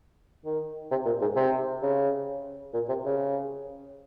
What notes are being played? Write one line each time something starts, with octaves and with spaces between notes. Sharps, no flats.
D#3
C3
A#2
G#2
C3
C#3
A#2
C3
C#3